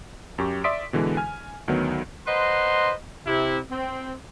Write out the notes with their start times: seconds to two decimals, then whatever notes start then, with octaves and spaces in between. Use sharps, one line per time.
0.38 F#2 G4 C#6
0.64 D5 E5 C6 D#6 B6 D7
0.93 B2 D3 E3 G#3
1.17 G#5 F6
1.68 D2 D#3 F#3 B3
2.27 B4 C5 D#5 F#5 A#5 C6
3.27 C3 E4
3.71 C4